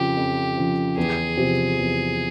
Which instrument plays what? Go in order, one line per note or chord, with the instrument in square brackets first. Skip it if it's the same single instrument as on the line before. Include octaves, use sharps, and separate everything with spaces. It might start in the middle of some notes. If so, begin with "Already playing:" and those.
Already playing: [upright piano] F2 C#3 F3 [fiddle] G4
[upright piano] F2
C#3 F3
[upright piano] E2 [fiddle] G#4
[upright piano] C3 F3 C4 G4
E2